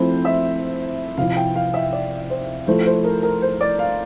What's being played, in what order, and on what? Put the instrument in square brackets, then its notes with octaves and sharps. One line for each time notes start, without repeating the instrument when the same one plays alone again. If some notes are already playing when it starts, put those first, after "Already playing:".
Already playing: [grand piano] F3 A3 C4 E4 [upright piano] C5
[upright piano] E5
[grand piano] C3 F3 C4 E4 [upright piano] F5
[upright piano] G5
F5
E5
D5
C5
[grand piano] F3 A3 E4 [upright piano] C5
[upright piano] C5
A#4
A#4
C5
D5
F5